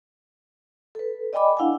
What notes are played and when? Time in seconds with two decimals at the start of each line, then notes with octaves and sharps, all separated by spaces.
0.95 A4 B4
1.33 D5 D#5 G5 G#5 B5 D6
1.57 D4 E4 F5 F#5 G#5